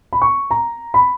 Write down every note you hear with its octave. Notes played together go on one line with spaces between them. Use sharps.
B5
C#6
A#5
B5